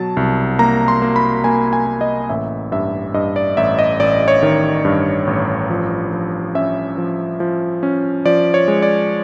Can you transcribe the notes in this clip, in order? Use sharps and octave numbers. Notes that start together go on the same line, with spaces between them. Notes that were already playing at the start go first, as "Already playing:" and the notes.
Already playing: B2 F#3 A5
C2
A#3 A#5
C6
A#3
B5
A#3 G#5
G#5
A#3
D#5
A1 E5
G2 E5
G2 D#5
D5
A1 E5
D#5
A1 D5
C#5
D#3
G2
A1
F3
F3
C#4 E5
F3
F3
C#4
F3 D5
C#5
G#3
D5